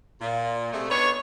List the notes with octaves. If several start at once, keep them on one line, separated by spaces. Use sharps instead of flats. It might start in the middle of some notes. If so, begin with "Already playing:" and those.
A#2
C3 G#3 A3
B3 D4 D#4 C#5